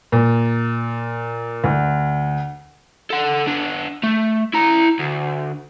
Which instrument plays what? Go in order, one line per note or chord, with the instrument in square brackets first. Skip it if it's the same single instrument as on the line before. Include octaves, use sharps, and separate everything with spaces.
[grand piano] A#2
D2
[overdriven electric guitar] A4 F#5
B3 D4
A3
E4 A#5
D2